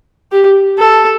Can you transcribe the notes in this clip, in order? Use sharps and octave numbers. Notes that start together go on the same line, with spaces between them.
G4
A4